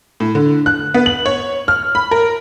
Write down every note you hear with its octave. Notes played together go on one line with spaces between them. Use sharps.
A2
D3
F#6
B3
F#7
C#5
F6
B5
A#4